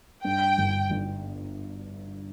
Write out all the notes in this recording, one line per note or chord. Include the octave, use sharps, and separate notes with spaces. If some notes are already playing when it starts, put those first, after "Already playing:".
G2 G5
G1
G1